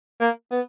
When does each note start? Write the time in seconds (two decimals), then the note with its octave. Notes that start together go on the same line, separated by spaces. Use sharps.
0.20 A#3
0.51 B3